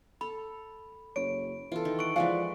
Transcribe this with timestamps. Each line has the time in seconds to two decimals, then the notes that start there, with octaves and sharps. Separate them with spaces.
0.21 A4 B5
1.16 F#1 C#5 D7
1.72 E3 F4 A4
1.85 D#3
1.99 F#5 C#6 D7
2.16 E3 F3 G#3 D5 F5 F#5 G#5